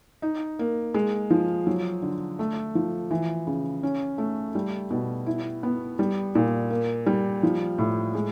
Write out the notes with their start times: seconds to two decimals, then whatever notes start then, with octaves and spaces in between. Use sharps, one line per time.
0.22 D#4
0.59 A#3
0.94 G#3
1.30 F3
1.67 F#3
2.02 D3
2.39 A3
2.75 F3
3.11 E3
3.47 C#3
3.83 C#4
4.18 A3
4.55 G3
4.91 B2
5.26 E4
5.63 B3
5.99 G3
6.35 A#2
6.70 A#3
7.06 G3
7.43 F3
7.78 A2
8.15 G#3